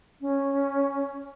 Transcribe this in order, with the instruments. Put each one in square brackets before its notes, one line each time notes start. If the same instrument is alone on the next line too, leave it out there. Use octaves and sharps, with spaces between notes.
[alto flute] C#4